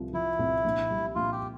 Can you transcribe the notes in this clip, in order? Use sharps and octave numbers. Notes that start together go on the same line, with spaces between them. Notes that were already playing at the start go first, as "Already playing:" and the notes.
Already playing: C2 F3
F3 E4
C2
A#1
G3
A#1 F4
G4